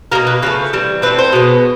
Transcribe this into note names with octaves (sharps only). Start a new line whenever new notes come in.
B2 G3 A#3 A#4
B4
C#3 F3 A3 B4
E3 G3 C4
E3 A3 C4 B4
C5
B2 G#3 B3